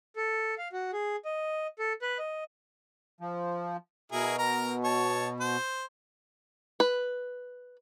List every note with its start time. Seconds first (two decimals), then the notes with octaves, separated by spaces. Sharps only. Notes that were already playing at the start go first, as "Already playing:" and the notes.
0.16 A4
0.58 F5
0.73 F#4
0.93 G#4
1.25 D#5
1.79 A4
2.02 B4
2.19 D#5
3.21 F3
4.12 B2 E4 G#4 A#4
4.38 A#4 A#5
4.84 C#5 A5
5.41 C5
6.80 B4